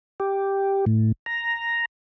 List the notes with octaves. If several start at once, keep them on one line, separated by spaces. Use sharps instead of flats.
G4
A2
A#5